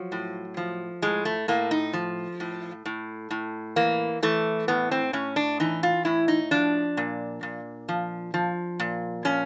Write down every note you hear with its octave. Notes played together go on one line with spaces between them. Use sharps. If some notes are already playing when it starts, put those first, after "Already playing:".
Already playing: F3 F#3
A2
F3
A2 G#3
A3
A2 A#3
D#4
F3
A2
A2
A2
E3 A#3
E3 A3
A2 B3
C4
A2 C#4
D4
E3 D#4
F4
A2 E4
D#4
F3 D4
A#2
A#2
F3
F3
A#2
F3 C#4